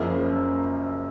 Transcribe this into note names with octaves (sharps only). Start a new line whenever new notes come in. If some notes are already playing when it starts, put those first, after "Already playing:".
Already playing: F#1 F#2 C#3 F3 A#3